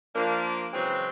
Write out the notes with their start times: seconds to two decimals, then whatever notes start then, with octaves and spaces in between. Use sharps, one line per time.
0.15 F3 A#3 D4
0.73 C#3 E3 F#3 G#3 C4